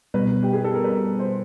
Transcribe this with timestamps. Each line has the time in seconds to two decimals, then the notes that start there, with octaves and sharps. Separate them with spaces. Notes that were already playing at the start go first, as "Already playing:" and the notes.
0.14 B2 G3 B3 B4
0.43 G4
0.53 G#4
0.64 A4
0.74 A#4
0.84 B4
1.19 C5